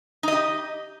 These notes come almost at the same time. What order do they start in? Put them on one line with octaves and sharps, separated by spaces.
D#4 D#5 G4